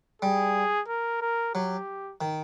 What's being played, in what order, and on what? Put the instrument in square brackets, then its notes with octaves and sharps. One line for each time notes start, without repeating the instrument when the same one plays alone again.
[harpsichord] G3 [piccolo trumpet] G#4
[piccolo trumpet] A#4
A#4
[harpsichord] F#3 [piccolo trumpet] G4
[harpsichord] D#3